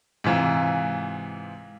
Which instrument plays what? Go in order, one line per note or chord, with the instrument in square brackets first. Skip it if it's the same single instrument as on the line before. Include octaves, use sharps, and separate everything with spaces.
[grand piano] G#2 C3 E3 F4